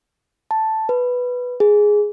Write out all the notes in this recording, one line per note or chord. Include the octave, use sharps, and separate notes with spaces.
A5
B4
G#4